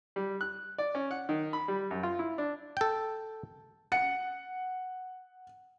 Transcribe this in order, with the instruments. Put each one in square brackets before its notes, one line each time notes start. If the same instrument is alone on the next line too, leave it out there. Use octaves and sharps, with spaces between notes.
[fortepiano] G3
F#6
D5
C#4
F#5
D#3
B5
G3
F#2
F4
E4
D4
[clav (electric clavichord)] A4 G5
[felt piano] F#5 C#7